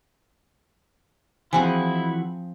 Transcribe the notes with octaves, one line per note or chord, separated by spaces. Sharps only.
E3 F3 C4 E4 F#4 G#4 G#5